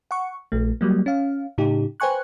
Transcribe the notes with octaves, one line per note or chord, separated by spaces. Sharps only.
F#5 C#6
A#1 A3
F#3 G3 A#3
C#4 F5
A2 C#3 D#4 G4
B4 C5 G5 G#5 C#6 F#6